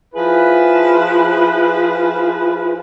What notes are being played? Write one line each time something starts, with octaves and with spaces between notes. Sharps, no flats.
F3 E4 G#4 B4